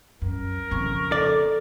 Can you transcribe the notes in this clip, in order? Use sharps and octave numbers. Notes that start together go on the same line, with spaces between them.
F#2 A#4
F2 C#3 C#6
A4 D5